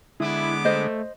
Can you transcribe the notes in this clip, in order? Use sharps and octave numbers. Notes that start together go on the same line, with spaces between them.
D3 G#3 B3 E4 D6
A3 C5 D#5